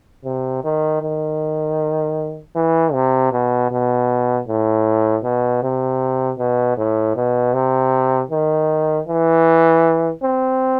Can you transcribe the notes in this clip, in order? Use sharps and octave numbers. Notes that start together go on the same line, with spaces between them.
C3
D#3
D#3
E3
C3
B2
B2
A2
B2
C3
B2
A2
B2
C3
D#3
E3
C4